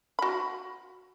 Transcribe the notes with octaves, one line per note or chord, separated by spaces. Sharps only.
F#4 B5